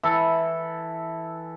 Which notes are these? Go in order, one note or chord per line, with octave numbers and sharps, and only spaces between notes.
E3 A4